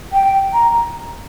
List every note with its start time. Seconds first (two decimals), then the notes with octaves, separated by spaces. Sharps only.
0.13 G5
0.53 A#5